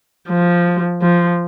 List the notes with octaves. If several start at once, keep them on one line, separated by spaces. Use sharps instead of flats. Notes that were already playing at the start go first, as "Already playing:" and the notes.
F3
F3